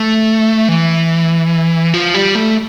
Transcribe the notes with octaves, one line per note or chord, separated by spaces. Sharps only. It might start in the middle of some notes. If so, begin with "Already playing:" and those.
Already playing: A3
E3
F3
G3
A3